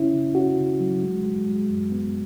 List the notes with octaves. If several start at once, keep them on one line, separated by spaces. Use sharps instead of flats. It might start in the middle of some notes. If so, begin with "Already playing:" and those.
Already playing: C#3 C#4 E4
C#3
C#4 F#4
C#3
F#3
G#3
G#3
G#3
F#2
B3